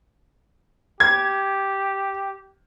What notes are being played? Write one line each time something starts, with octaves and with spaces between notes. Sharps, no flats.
G4 G#6